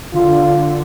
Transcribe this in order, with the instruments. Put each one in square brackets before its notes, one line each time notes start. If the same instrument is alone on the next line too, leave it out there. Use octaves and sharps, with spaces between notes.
[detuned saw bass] D3 [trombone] F4